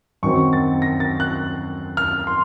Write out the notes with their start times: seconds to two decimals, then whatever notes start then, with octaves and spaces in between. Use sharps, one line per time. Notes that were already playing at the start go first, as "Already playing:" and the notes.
0.23 F#2 D#3 F#3 C4 C#6
0.53 A6
0.82 A#6
1.00 A6
1.20 F#6
1.97 F6
2.27 C6